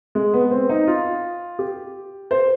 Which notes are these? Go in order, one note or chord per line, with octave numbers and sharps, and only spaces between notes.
G#3
B3
C4
D#4
F4
G4
C5